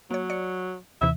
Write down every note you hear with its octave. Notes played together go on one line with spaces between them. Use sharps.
F#3 A#3 C#5
D5 C#7
D#2 C3 E3 E5